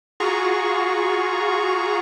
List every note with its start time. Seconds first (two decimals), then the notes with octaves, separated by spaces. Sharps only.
0.20 F4 F#4 G#4 A#5 C#6